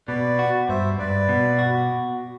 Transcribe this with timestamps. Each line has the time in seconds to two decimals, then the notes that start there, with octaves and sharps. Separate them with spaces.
0.08 B2 B4 D5
0.39 F#4
0.68 G2 C5 E5
0.98 G2 B4 D5
1.29 B2
1.59 F#4